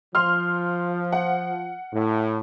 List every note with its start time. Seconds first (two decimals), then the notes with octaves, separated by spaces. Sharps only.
0.15 F3 C6 F6
1.13 F#5
1.93 A2